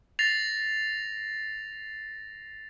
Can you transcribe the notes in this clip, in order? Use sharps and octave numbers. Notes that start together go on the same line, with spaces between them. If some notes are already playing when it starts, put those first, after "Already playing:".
A6 A#6 C7 F7